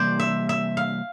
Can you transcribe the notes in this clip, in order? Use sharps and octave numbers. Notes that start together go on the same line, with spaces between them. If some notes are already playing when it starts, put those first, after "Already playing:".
Already playing: C3 E3 G3 A#3 C5 D5
E5
E5
F5